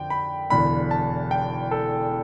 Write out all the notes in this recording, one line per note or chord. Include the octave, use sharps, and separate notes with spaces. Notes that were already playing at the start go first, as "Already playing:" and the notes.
Already playing: F2 D3 G5
B5
E1 E2 D3 B5
A5
G5
A4